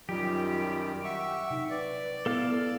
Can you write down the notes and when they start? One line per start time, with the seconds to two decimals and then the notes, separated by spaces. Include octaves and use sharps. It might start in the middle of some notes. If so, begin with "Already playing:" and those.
0.09 F#2 D#3 F#3 G3 F4 G4
1.04 E5 F#5 C#6
1.50 C3 D#4
1.70 B4 D5
2.26 B3 E4 A4 F5 F6